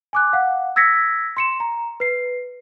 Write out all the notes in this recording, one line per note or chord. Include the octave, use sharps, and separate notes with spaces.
G#5 D6 F#6
F5 F#5
E6 G#6 A#6 B6 C#7
C6 C#7 E7
A#5
B4 C7